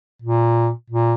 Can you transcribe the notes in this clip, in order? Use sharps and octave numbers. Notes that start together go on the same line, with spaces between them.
A#2
A#2